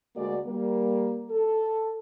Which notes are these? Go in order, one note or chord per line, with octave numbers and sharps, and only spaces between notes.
D2 G#3 A#3 F#4 D5
G3 A#3
A4